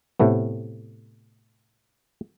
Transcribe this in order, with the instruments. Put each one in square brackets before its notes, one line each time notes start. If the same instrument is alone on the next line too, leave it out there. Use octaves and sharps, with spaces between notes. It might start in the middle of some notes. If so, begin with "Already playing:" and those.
[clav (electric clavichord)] A2 C3 A3 B3